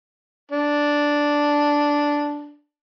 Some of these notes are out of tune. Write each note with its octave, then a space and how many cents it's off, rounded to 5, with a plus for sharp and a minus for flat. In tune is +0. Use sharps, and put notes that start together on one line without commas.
D4 -5